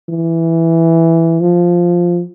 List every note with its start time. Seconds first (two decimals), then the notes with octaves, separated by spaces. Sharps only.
0.10 E3
1.41 F3